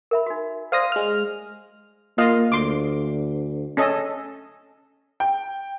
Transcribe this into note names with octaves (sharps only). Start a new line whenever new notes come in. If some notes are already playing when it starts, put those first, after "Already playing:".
A#4 E5 B5
D#4 F#4
C5 D5 F5 C6 D#6 A#6
G#3 F6
A#3 F4 D#5 F5
D2 C6 D6
C#4 A4 D#5
G5